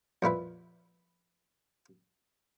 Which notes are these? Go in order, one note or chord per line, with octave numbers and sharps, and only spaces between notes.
F2 A#2 E4 B4